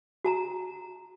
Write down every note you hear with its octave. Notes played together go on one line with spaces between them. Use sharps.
F#4 A5 A#5